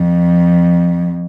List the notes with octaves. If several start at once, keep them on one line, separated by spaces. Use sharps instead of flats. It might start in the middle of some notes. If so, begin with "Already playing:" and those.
Already playing: F2